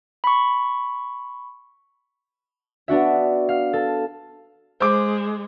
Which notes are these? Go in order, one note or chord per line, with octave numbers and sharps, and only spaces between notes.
B5 C#6
B3 D4 F#4 E5
F5
A4
G#3 C5 D6